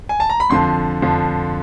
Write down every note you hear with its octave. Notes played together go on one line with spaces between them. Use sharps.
G#5
A5
A#5
B5
F2 D3 F3 C6
F2 D3 F3